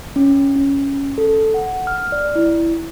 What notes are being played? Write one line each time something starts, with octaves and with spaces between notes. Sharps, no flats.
C#4
C#4
A4
F#5
F6
D5
E4